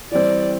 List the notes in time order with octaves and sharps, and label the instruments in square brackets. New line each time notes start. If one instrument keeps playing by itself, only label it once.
[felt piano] E3 G3 C4 [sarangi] D5